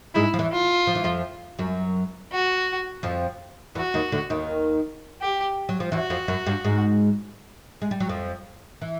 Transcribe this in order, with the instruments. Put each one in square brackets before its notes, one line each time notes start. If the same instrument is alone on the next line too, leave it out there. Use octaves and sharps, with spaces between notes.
[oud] G#2 G#3 [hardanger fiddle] E4
[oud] F3
E2 E3
[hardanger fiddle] F4
[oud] F3
E3
F2 F3
F#2 F#3
[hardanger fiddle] F#4
[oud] F2 F3
[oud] E2 E3 [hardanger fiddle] F#4
[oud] D#2 D#3
D2 D3
D#2 D#3
[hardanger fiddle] G4
[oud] F#3
F3
[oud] E2 E3 [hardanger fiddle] F#4
[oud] F2 F3
F#2 F#3
G2 G3
G#2 G#3
G#3
G3
F#3
F2 F3
E3